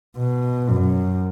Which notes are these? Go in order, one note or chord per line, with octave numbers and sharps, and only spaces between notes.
B2
F#2